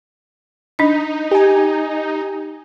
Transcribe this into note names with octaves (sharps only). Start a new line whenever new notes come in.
D4 D#4 D#5
G4 G#5